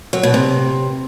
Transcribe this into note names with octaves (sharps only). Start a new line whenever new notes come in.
F#3
B2
C3